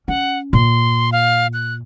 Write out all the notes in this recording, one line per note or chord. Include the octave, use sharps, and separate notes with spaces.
C#4 F#5
A#2 C6
F5
F#6